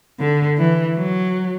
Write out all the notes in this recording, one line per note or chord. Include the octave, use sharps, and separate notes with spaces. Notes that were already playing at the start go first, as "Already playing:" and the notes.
D3
E3
F#3